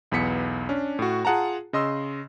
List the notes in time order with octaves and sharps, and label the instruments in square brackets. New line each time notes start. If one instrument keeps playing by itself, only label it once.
[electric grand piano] B1 E2 B3 B6 C#7
C#4 D4
A2 F#4
F4 G#4 F#5 A5 A#5
C#3 D#5 C6 E6